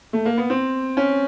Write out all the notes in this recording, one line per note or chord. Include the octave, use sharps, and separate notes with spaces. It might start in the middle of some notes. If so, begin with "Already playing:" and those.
A3
A#3
B3
C4
C#4